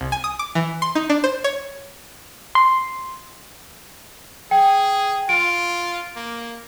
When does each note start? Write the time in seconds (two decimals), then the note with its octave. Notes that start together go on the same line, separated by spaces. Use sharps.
0.01 C2
0.12 G#5
0.24 D#6
0.39 D6
0.55 E3
0.82 C6
0.95 D#4
1.10 D4
1.24 C5
1.44 C#5
2.55 C6
4.51 G#4 G5
5.29 F4 D7
6.16 A#3